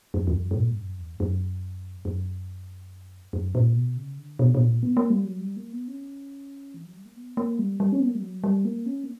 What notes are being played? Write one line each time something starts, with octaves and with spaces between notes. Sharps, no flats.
F#2
E2
F#2
G2
A#2
G2
F#2
E2
G2
F#2
F#2
F#2
A#2
B2
C#3
D3
B2
B2
A#2
B3
A#3
G3
F#3
G3
A#3
B3
C#4
E3
F#3
G3
A#3
B3
A#3
G3
G3
C#4
B3
A#3
G3
F#3
G3
A#3
C#4
A#3